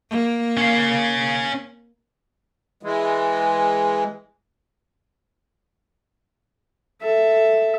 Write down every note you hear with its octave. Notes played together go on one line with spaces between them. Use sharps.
A#3
C#4 F5
E3 G#3
A4 E5